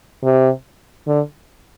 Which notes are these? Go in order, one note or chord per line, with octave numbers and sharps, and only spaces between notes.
C3
D3